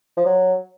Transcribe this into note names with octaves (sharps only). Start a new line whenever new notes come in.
F3
F#3